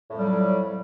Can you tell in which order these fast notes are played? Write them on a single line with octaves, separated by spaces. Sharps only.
A2 F2 F#3 G3